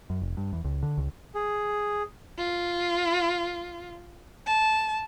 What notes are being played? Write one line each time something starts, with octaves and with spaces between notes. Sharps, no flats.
F#2
F1
G2
E2
C#2
D3
C#2
G#4
F4
A5